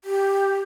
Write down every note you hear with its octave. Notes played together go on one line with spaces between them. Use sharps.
G4